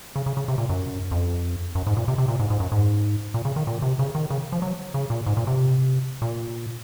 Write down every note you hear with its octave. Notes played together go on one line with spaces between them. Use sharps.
C#3
C#3
C#3
C3
A#2
F#2
F2
F#2
G#2
A#2
C3
C3
A#2
G#2
G#2
F#2
G#2
A#2
C#3
D#3
A#2
C3
C#3
D#3
C#3
F3
F#3
C#3
A#2
G#2
A#2
C3
A#2